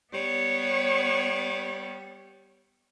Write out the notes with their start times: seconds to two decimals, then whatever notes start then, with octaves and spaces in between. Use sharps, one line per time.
0.14 G3 B3 C#5